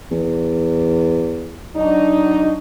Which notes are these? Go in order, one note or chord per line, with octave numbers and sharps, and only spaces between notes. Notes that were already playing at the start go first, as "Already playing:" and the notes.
E2
F#3 D4 D#4